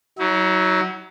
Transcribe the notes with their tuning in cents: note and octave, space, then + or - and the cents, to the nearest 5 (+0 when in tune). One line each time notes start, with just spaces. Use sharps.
F#3 +15 E4 -40